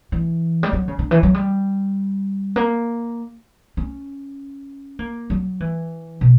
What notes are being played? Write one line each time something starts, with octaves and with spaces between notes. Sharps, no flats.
E3
G3
F#3
C#3
D3
E3
F#3
G3
A#3
C#4
A#3
F#3
E3
B2